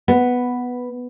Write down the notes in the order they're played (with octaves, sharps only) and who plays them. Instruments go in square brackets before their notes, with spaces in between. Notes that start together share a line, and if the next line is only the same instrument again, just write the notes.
[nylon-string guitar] B3